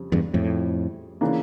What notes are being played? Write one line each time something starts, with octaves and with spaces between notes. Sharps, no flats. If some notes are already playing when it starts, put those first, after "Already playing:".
Already playing: F2 C#3 G3
E2 G2
F2 A2
C#3 E3 A#3 D4